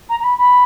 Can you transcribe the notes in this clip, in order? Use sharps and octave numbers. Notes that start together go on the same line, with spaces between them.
A#5
A#5
B5
B5